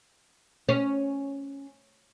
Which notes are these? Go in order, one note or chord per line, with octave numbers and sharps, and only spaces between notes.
C#4